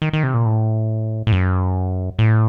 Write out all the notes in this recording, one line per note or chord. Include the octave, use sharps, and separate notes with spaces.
D#3
D#3
C3
A#2
A2
A2
F#2
A2